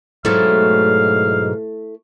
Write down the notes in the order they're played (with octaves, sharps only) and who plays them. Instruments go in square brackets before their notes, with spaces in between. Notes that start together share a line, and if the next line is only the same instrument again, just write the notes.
[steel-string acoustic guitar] G#2 B2 F#3 [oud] A3 E4 A4 [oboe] F5